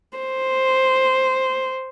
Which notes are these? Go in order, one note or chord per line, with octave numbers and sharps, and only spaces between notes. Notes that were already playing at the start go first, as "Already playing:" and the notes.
C5